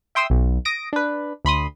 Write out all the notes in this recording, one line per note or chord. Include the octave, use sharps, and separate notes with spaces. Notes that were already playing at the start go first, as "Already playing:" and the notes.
E5 G5 C6 D#6 E6
B1
D#6 A#6 D7
D4 B4
D2 B5 C6 D#6